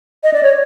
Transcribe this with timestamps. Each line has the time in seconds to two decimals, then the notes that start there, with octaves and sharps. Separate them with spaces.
0.23 D#5
0.33 D5
0.43 C#5